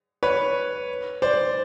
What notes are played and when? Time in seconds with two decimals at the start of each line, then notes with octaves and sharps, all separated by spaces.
0.23 B4 C#5
1.22 C5 D5